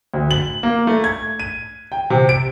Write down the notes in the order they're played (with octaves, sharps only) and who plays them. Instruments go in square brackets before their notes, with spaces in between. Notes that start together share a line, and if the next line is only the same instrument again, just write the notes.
[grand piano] D2
F#7
A#3
A3
G#6
D#7
G5
C3
D7